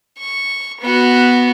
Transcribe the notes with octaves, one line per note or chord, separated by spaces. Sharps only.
C#6
B3 F#4